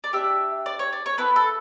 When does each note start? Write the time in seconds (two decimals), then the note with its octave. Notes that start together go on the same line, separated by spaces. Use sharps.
0.04 D5
0.13 D4 G4 E5
0.66 D5
0.79 C#5
0.93 D5
1.06 C#5
1.18 B3 E4 A4 B4
1.36 A4